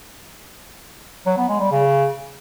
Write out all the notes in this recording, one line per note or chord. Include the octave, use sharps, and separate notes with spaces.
F#3
B3
G#3
G3
C#3